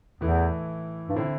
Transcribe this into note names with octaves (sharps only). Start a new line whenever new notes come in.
E2 A2 E3 A3 E4
G2
A2 D3 C4 E4